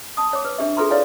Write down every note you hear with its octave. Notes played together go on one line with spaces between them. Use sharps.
A5 D#6
C#5 D6
B4
D4 G4 E5
F4 G#4 A4 B4 A#5 C6
E4 B4 C#5 D5 F5 G#5